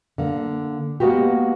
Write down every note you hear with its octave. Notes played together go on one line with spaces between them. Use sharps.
D3 A#3
G#3 A#3 B3 F#4 G4